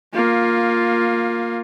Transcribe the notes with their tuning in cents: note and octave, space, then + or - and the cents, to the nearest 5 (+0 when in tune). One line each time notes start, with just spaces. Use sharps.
A#3 +0 F4 +15